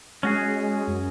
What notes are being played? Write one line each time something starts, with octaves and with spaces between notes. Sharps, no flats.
G#3 C#4 F#4 G#4
F#2